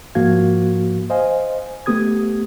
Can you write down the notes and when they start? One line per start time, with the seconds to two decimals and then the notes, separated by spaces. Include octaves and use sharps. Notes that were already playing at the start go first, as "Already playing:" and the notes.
0.15 G#2 F3 A#3 F#4 F5 G#6
1.10 C5 D#5 F5 G#5
1.86 A3 B3 G4 D#6 G#6